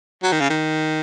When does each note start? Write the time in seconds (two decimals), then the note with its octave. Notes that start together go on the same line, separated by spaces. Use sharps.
0.23 F#3
0.32 D#3
0.40 C#3
0.50 D#3